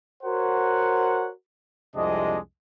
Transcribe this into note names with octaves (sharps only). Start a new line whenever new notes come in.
F#4 A#4 C5 C#5 F#5
C2 F2 C3 G#3 D4 D#5